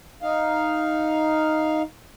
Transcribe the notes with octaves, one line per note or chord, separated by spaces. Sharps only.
D#4 F5